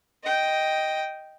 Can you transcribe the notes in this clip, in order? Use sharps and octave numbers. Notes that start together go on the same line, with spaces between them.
D#5 G5